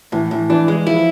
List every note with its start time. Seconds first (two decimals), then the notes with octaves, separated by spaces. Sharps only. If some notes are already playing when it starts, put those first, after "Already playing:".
0.12 A2 E3
0.31 A2 E3
0.50 E3 D4
0.68 E3 G#3
0.87 F3 E4